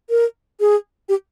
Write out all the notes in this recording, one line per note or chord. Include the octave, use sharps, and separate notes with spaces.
A#4
G#4
G4